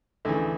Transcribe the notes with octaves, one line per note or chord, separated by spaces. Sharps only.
D2 C#3 E3 A3